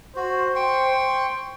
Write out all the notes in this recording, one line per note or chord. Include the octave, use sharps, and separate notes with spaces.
F#4 C5
G5 C6 C#6